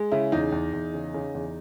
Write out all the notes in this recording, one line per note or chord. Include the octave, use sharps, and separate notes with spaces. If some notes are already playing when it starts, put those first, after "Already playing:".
Already playing: G#3
C#3 E4
E2 D#4
E2
E2
C#3
C#3
E2